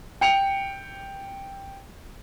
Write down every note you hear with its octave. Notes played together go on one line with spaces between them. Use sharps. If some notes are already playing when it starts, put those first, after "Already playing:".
G5 C#7 F7